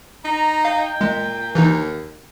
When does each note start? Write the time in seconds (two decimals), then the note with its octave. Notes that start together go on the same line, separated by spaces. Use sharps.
0.25 D#4 A#5
0.65 F5 G5
1.01 A#2 G#3
1.55 D#2 E3 D#4